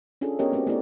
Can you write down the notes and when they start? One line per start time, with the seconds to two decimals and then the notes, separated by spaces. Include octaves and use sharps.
0.21 C#4 D4 F4 G#4 A4
0.39 B3 C#4 G4 A#4 C#5 D#5
0.52 A3 C4 C#4 F#4
0.67 A3 B3 D#4 E4 G4 D5